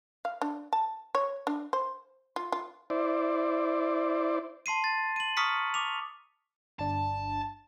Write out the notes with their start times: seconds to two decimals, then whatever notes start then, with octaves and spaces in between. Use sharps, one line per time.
0.25 F5
0.42 D4
0.73 A5
1.15 C#5
1.47 D4
1.73 C5
2.36 F4
2.52 F4
2.90 E4 C5 D5
4.66 A5 C6 C7 D#7
4.84 A6
5.16 D#7 F#7
5.37 A#5 C#6 D#6 F6 B6 C#7
5.74 D6 F7
6.79 G1 D4 A5